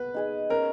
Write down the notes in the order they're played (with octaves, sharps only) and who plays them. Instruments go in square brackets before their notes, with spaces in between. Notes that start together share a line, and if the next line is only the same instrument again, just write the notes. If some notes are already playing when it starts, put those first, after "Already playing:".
Already playing: [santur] B3 [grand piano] B4
[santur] D#4 G#4 D#5
[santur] C#4 [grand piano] A#4